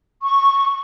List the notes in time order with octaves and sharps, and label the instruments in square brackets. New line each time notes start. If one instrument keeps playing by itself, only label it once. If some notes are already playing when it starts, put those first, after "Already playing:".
[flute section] C#6